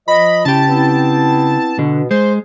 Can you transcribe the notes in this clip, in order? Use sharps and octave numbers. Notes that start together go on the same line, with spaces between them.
F3 D#5 B5
C#3 E4 G4 A5
B3 C4 E4
B2 D3
G#3 C5